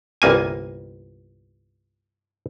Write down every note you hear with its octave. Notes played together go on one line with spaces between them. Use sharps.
G1 C2 A#3 G#5